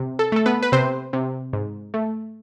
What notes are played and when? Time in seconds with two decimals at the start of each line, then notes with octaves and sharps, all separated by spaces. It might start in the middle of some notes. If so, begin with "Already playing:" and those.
Already playing: C3
0.19 A4
0.32 A3 A4
0.46 B3 B4
0.63 B4
0.72 C3 C4 C5
1.13 C3
1.53 G#2
1.94 A3